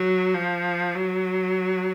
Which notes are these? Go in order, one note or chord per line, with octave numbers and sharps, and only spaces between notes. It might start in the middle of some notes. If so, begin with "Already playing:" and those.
Already playing: F#3
F3
F#3